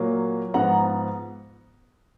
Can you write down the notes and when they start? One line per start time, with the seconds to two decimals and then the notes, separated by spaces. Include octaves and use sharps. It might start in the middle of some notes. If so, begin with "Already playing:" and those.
Already playing: A#2 F#3 A#3
0.54 G#2 F3 B3 F#5 A#5